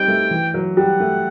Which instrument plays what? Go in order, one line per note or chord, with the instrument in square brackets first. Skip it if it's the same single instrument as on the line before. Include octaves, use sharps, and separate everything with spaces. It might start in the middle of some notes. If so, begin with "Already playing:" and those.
Already playing: [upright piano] G3 C4 D#4 [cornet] G5
[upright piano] A3
E3
F#3
[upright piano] G3 [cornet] F#5
[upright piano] A3